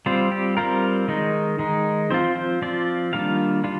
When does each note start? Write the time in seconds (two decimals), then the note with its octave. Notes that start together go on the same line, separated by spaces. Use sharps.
0.06 G3 C4 F4 C5
0.32 G4
0.57 G3 C4 F4 A#4
1.08 D#3 G#3 D#4
1.59 D#3 G#3 D#4
2.11 F3 C4 F4 C5
2.36 C5
2.62 F3 C4 F4 D5
3.13 D#3 G3 A#3 D4 F4 F5
3.64 G3 D4 F4